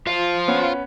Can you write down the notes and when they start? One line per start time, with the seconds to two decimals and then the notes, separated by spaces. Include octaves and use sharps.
0.07 F4 C5 F5
0.48 B3 C#4